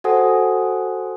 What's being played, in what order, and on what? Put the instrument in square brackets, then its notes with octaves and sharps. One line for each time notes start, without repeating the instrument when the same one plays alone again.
[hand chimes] F#4 A4 C5 F#5 G#5 D#6